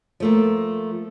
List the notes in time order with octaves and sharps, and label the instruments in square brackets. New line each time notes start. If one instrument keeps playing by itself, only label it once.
[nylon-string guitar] F3 A3 A#3